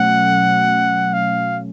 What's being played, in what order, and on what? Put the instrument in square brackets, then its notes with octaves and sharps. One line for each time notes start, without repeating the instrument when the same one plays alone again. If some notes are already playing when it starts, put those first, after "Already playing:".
Already playing: [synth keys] B2 F#3 A3 C#4 [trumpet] F#5
[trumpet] F5